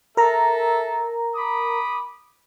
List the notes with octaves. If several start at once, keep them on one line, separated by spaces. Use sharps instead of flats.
A4 A#4 E5 A#5
B5 D6 D#6